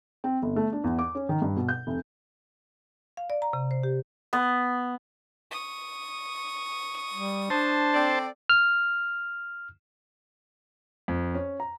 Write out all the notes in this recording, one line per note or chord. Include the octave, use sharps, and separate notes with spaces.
C4
G1
A3
D4
E2
D6
C#4
D#3
G2
B2
G6
F1
F5
D5
A#5
C3
C5
G4
B3
C#6 D#6
G3
D4 C5 A5
C4 A4 D5
F6
F2
C#4
A#5